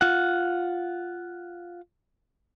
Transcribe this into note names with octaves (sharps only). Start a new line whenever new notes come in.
F4 F#5